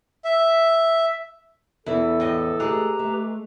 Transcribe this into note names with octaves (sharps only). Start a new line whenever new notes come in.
E5
E2 E3 E4 A4
A2 D#5
G#3 A3 G4 G#4 B4 A#5
A3